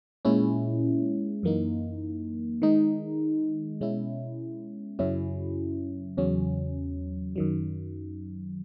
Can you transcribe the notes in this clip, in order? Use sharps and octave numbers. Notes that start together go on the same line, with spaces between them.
A#2 G#3 C#4 E4
F#2 E3 A#3 D#4
D#3 G#3 D#4
B2 G#3 C#4 E4
F#2 C#3 F#3 C#4 E4
E2 C#3 F#3 C#4
F#2 D#3 F#3